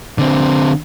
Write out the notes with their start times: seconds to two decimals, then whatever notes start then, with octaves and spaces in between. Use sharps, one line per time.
0.18 D3 C4